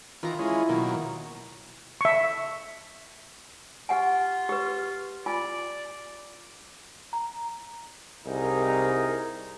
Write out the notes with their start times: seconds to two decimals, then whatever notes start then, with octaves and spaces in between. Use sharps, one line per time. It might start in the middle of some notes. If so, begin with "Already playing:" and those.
0.23 D#3 E3 F4 A#5
0.39 G#3 C#4 E4
0.69 B2 D#3 F#3 A#3
2.01 E5 C#6
3.89 F4 G4 F#5 G#5
4.49 G4 B4
5.26 F4 D5 G#5
7.13 A#5
8.26 C2 D#4 G#4 A#4